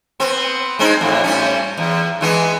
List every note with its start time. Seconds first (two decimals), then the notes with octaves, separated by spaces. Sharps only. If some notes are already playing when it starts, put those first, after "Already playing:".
0.20 B3 C4
0.79 G#3 C4 D#4
1.01 F2 A2
1.24 A2 G3 C#4
1.77 E2
2.21 E3 G#3 B3